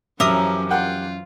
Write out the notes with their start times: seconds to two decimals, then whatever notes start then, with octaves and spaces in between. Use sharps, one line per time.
0.20 F#2 E3 F3 C#4 G4 A#4 E5 D#6
0.71 F4 F#5 G5